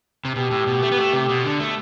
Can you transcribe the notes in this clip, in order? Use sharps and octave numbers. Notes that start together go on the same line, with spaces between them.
C3
B2 G4
A2
B2
A3
B3
A3
C3
B2
D3
A3